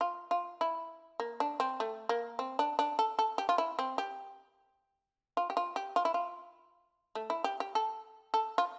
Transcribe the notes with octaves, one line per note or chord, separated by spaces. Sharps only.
F4
F4
E4
A#3
D4
C4
A3
A#3
C4
D4
D4
A4
A4
G4
F4
E4
C4
G4
F4
G4
F4
G4
F4
E4
F4
A3
E4
G4
G4
A4
A4
F4